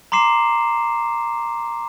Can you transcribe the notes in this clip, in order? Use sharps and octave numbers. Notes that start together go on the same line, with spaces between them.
A#5 C6 D6 C7 E7